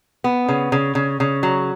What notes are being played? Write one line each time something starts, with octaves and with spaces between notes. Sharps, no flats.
B3
C#3
C#3
C#3
C#3
F#3